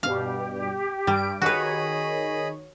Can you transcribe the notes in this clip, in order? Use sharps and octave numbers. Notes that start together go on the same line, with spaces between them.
G2 B2 G3 G4 F5
G2 G3 D7
D#3 F#4 G#4 B4 C#5 D#5 B5